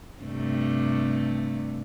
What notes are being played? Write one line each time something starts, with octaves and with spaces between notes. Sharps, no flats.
G2 C3 A3